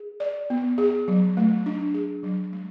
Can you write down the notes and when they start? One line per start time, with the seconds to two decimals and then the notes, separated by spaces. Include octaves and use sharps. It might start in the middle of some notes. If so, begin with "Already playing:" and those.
Already playing: G#4
0.20 D5
0.50 B3
0.78 G#4
1.08 F#3
1.37 A3
1.66 D4
1.94 G#4
2.23 F#3
2.53 G#3